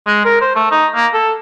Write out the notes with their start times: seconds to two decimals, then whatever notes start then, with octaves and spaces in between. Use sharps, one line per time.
0.07 G#3
0.25 A#4
0.41 C5
0.56 A3
0.71 D#4
0.95 A#3
1.14 A4